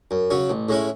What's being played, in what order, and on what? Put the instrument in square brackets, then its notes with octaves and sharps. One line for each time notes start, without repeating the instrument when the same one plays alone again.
[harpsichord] F#2
C#3 F#3 C#4
A1
A2 G#3 C#4 E4